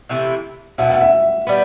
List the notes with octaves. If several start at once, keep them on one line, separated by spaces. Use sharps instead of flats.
C3 E3 A3 E4
B2 F#3 B3 E4 E5
F#5
E5
G3 B3